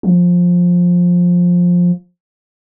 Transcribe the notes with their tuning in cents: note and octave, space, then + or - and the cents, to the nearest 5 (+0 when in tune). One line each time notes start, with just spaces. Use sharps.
F3 +15